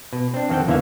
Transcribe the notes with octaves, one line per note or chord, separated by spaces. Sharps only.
B2
C4 D4
F2 D#3 C4 A4 F#5 G5
E2 D3 E3 A#3 E5 F5